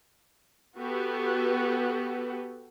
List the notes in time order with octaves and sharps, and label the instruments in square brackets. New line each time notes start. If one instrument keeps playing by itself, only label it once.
[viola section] B3 F#4 G4 A4 B4